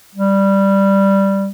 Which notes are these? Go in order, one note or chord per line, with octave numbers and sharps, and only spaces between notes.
G3